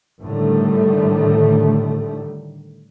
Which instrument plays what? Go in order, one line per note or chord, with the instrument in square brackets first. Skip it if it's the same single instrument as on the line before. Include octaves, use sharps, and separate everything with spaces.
[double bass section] A2 D3 D#3 G3 A3